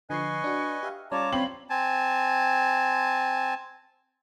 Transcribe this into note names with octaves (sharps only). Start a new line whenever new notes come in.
D3 F3 B4 D#5 G#5 C#6 C7
D4 F#4
G4 E5 F5
G3 C#4 F4 C#5 D5 A5 A#5 D6
C4 F5 B5 F#7
C4 G#5 A5